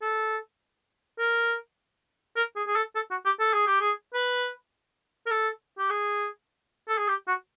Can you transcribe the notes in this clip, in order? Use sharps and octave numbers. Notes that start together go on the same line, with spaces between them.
A4
A#4
A#4
G#4
G#4
A4
A4
F#4
G4
A4
G#4
G4
G#4
B4
A#4
A4
G4
G#4
A4
G#4
G4
F#4